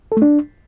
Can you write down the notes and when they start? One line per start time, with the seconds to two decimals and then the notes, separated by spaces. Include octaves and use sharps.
0.12 A4
0.17 A3
0.22 D4